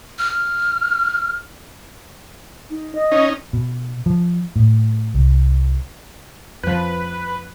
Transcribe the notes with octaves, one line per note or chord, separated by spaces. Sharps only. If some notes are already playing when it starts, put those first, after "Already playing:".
F6
D#4
D#5
C#4 D#4
B2
F3
A2
C2
F2 F3 B4